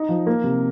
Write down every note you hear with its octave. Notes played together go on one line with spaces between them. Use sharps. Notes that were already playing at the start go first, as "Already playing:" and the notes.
Already playing: D#4
F3
A#3
C3